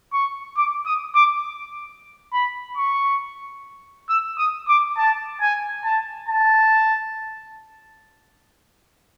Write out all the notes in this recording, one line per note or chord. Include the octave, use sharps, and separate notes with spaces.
C#6
D6
D#6
D6
B5
C#6
E6
D#6
D6
A5
G#5
A5
A5